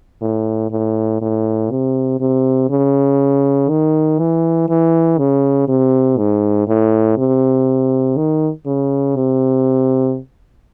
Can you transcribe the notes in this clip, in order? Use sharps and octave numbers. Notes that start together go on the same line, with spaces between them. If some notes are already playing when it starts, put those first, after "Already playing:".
A2
A2
A2
C3
C3
C#3
D#3
E3
E3
C#3
C3
G#2
A2
C3
D#3
C#3
C3